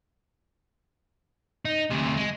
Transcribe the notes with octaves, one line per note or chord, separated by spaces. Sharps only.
D#4
D2 C3
G#3